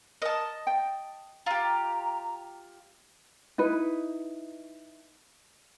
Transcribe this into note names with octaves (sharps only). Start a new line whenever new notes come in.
A#4 D#5 A5
G5
F4 G4 A#5
D#4 E4 B4